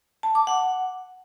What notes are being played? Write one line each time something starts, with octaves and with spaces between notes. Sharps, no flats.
A5
D6
F#5